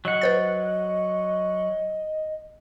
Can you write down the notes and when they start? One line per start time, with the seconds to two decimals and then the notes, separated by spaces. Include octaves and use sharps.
0.05 F#3 D#5 F#5
0.22 B4 C5 A6